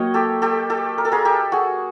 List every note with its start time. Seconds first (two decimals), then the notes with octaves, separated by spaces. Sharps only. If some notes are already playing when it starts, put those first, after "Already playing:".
Already playing: F#3 A#3 C#5 D#5 G5
0.14 G4 A4
0.42 G4 A4
0.70 G4 A4
0.98 A#4
1.05 A4
1.12 G#4 A#4
1.25 G4 A4
1.52 F#4 G#4